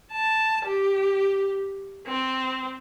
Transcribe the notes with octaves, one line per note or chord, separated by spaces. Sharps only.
A5
G4
C4